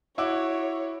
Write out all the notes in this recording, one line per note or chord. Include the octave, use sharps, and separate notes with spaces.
E4 F#4 C#5 D6